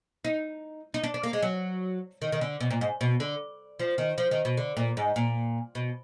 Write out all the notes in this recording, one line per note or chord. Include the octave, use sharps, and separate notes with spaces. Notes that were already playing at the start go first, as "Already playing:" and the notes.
D#4
D#4
D4
D4
A#3
G#3
F#3
D#3
D#3
D3
B2
A#2
G#2
B2
D3
F3
D#3
F3
D#3
B2
D3
A#2
G#2
A#2
B2